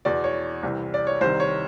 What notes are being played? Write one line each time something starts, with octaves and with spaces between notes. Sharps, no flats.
E2 B2 D5
C#5
C2 C3 E3
D5
C#5
C2 C3 D#3 C5
C#5